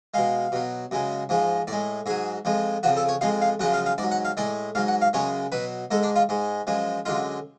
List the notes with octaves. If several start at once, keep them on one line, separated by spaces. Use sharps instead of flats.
B2 G#3 F5
B2 F#3
F#2 C#3 G#3
G#2 F3 G#3
A2 G#3 D5
G#2 F#3 G#4
F2 F3 G#3
F2 C#3 F3 F#4
A4
C#5
F2 F3 G#3 F5
F5
F#2 C#3 F3 G#3 F#5
F5
F5
G#2 D5
F#3
F#5
F5
A2 G#3 D5
G#2 F#3 F5
F#5
F5
F#2 C#3 G#3 C#5
B2 F#3 B4
G#2 G#3 A4
D4
F4
G#2 G#3
F#2 F3 G#3
F#2 D3 G#3 F4